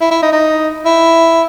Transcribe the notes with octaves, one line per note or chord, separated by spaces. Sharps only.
E4
E4
D#4
D#4
E4